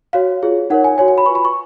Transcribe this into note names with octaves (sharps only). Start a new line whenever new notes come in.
F#4 C#5 F5
F4 G#4 C#5
D#4 A#4 C#5 F#5
G#5
F#4 C#5 G#5
G#5
B5
F4 B4 C#6
B5
C#6